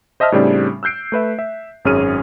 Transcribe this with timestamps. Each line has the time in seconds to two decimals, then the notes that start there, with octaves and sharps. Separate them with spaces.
0.20 C5 D#5 E5 A5 F6
0.32 A2 C#3 G3 C4 D4
0.83 E6 F#6 G6 C7 D7
1.12 A3 B4 E5
1.39 E5
1.85 G#1 F#2 C#4 G#4 F6 D#7